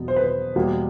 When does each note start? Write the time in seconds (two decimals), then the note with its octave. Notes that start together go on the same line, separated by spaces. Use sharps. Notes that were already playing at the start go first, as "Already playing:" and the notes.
Already playing: E2 B2 F#3 B3
0.08 C5
0.16 B4
0.24 C5
0.56 E2 B2 G3 A#3